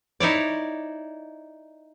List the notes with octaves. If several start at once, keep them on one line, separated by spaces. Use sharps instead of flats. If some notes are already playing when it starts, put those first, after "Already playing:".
D#4 E4 C#5 D5